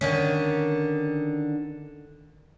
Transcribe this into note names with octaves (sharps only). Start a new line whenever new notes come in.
D3 D#3 C#4